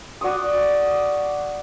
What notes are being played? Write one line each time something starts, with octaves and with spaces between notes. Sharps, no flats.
F#4 D5 C#6 D#6